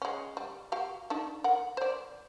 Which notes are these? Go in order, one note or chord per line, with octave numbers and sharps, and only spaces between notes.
G#3 C#4
G3
F#4 G4 F5
D4 D#4 A4
A#4 F#5
C5 D5